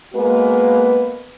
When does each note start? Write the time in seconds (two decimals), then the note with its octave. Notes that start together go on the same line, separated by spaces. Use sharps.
0.14 G#3 A#3 B3 F#4 B4